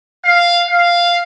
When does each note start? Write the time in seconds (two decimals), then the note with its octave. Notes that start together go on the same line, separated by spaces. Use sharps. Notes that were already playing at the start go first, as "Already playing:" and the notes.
0.24 F5
0.69 F5